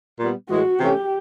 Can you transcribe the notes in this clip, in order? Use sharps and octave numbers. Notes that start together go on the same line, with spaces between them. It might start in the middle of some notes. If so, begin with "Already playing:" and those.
A#2 G3 B3
A2 E3 G#3 F#4
C3 E3 A3 C#4 G4